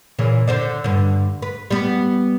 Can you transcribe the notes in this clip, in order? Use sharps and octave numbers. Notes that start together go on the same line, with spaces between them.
A#2 C#3 E3
D3 C5 D5
G2 D3
B4
G3 B3